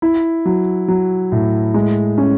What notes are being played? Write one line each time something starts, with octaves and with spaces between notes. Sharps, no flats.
E4
F#3
F#3
A2
G#3
C#4